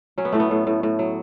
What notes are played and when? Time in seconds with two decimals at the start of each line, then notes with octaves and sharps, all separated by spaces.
0.18 F#3 C#4
0.25 B3
0.32 A2 A3
0.40 B3
0.51 A2
0.67 A2
0.83 A2
0.99 F#3